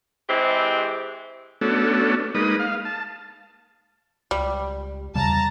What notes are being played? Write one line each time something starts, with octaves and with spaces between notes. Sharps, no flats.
E3 G#3 C4 E4 G4
A3 B3 C#4 D4 F#4 A4
G#3 A#3 D#4 B4 D#6
F5
A5
C#2 G3
E2 C#3 G3 A5 A#5